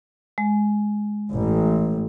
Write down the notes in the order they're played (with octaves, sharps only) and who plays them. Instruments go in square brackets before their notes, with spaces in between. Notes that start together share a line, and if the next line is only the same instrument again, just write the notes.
[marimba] G#3
[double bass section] A1